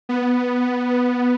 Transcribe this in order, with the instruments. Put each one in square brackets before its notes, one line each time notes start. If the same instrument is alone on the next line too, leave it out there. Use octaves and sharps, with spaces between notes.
[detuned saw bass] B3